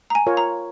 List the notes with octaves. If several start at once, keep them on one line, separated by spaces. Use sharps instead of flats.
A#5
G#5
F4 A#4 C#5
A#5